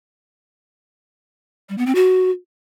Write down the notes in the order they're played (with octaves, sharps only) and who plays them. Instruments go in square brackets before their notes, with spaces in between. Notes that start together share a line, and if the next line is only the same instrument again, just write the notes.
[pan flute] G3
B3
C4
F#4